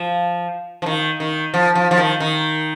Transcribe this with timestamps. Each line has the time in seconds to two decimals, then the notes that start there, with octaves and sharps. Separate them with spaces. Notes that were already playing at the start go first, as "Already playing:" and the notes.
Already playing: F3
0.82 F3
0.86 D#3
1.20 D#3
1.54 F3
1.75 F3
1.91 F3
1.98 D#3
2.20 D#3